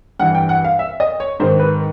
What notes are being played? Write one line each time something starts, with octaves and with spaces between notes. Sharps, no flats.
G2 E3 F#5
G5
F#5
F5
E5
D#5
C#5
G#2 D#3 C5
B4